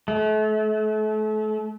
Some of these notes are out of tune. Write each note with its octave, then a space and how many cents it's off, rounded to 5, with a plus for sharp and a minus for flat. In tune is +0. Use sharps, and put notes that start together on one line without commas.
A3 -35